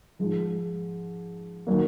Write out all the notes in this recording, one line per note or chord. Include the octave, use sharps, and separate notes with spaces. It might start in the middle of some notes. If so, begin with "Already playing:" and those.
G#2 F3 G#3
D#3 F#3 A#3